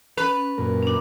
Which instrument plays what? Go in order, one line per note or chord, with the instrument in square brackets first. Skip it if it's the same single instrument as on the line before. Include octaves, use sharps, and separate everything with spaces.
[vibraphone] C#4 [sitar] B4
[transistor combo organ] F#2 A#2 A#4
[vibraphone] C#4 D4